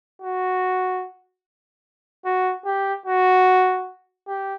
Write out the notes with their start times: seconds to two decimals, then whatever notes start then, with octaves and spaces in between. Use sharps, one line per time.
0.22 F#4
2.25 F#4
2.65 G4
3.06 F#4
4.27 G4